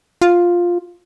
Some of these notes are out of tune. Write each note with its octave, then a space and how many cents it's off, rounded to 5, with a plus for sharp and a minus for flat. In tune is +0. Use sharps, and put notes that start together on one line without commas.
F4 +5